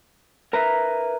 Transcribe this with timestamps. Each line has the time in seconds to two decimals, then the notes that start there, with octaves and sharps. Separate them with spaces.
0.53 A#4 B4 E5 A#5